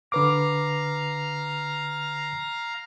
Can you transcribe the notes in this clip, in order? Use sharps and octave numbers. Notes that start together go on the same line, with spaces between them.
D3 B4 F5 A#5 D6